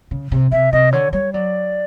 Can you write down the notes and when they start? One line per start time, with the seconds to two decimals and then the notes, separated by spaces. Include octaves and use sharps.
0.11 C#3
0.32 C3
0.52 C3 E5
0.72 C3 D#5
0.92 D3 C#5
1.13 G3 C#5
1.33 F#3 D5